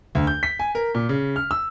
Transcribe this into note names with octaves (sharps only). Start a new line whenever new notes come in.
D2
G6
B6
G#5
A#4
A#2
C#3
F6
E6